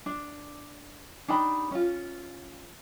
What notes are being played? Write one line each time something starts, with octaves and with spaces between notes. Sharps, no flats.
D4
D4 D#4 G4 B5
C#4 F4